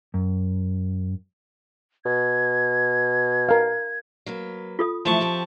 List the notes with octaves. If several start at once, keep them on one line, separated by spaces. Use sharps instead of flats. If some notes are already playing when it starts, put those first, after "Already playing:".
F#2
B2 G#6
A#4 F5
F#3 A#3 B4
F4 A4 D#6
E3 F3 A3 E5 A5 C#6
C4 G4 E5